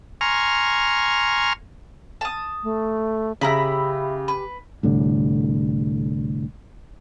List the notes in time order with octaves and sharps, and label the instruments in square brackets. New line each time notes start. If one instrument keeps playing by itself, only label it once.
[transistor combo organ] G#5 A#5 C6 C#6 F6
[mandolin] A5 D#6
[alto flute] A3
[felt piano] C#3 [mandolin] E4 A#5 B5 [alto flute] G4
[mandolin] B4
[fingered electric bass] C2 A2 D3